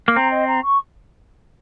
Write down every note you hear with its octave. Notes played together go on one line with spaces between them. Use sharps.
A#3
C4 A#5
D#5
A#5
C#6